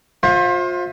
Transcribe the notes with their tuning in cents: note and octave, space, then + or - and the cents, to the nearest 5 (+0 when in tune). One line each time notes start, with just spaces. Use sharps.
F4 +35 C5 +25 E5 +0